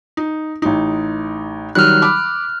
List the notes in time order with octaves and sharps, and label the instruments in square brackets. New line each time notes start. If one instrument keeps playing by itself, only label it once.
[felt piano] D#4
A1 D#4
[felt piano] D#3 F#3 G3 [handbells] F6 F#6
[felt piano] B5 D6